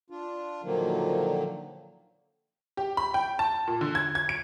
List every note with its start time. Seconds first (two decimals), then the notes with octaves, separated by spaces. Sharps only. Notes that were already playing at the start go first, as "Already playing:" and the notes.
0.10 D4 F4
0.63 A#2 D3 D#3 F3 F#3 A#3
2.77 G4
2.97 B5
3.14 G5
3.39 A5
3.67 A#2
3.81 D3
3.95 G#6
4.15 G#6
4.29 D7